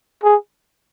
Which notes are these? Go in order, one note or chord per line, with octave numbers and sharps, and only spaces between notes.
G#4